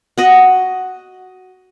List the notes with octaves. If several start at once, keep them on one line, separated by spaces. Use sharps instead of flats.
F#4 D#5 F#5